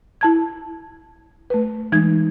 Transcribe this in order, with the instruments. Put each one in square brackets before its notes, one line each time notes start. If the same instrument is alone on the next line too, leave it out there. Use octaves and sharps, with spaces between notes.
[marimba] E4 A5 G#6
A3 B4
E3 G#3 D#4 G#6